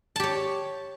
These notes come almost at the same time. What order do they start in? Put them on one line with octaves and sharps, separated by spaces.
A5 G4 C#5